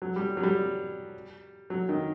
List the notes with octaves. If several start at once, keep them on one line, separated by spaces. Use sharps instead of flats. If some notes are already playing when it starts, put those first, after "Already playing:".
F#3
G3
F#3
G3
F#3
D#3